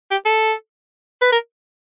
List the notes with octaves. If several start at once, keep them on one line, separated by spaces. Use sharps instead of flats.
G4
A4
B4
A#4